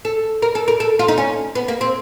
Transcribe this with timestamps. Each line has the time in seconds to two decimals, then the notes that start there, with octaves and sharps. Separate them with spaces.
0.05 A4
0.42 A#4
0.55 A4
0.68 A#4
0.80 A4
0.99 F4
1.08 D#4
1.18 C#4
1.55 B3
1.68 A#3
1.81 C4